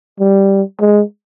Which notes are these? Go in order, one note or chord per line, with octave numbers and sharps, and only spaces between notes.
G3
G#3